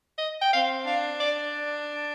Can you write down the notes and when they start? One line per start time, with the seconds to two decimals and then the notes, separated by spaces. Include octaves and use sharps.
0.18 D#5
0.41 G5
0.53 C4 F5
0.86 D4 F5
1.20 D5